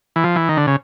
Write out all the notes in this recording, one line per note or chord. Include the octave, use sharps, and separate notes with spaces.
E3
F3
E3
D#3
D3
C#3